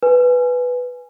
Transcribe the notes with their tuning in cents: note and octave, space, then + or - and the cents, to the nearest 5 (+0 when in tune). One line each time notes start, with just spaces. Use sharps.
B4 +0 G#5 +0